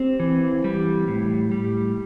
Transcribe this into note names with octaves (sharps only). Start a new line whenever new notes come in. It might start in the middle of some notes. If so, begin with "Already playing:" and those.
Already playing: C4 G4
E3
G3
A2
G3